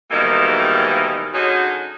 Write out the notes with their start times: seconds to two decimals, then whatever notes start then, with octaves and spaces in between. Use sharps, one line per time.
0.11 G#2 B2 D#3 E3 G3 A#3
1.33 D3 F#3 C#4 D#4 F#4 G#4